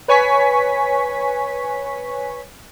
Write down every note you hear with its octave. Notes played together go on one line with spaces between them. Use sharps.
B4 C#5 G#5 C#6 B6